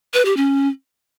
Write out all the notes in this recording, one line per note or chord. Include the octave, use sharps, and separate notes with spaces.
B4
G4
C#4